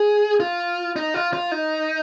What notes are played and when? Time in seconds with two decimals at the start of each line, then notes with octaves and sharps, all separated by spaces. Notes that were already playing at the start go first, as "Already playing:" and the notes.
Already playing: G#4
0.40 F4
0.96 D#4
1.14 F4
1.33 F4
1.52 D#4